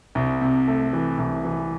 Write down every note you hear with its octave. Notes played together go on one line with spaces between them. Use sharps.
C2
C3
A3
E3
C2
E3